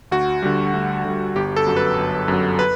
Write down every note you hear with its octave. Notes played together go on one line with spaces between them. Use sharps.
D2 F#4
D3 G3
D2
D3 G3
G1 G4
A4
F#2 F#3
B4
G1
F#2 F#3
B4